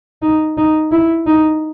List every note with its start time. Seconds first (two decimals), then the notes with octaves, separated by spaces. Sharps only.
0.22 D#4
0.57 D#4
0.92 E4
1.27 D#4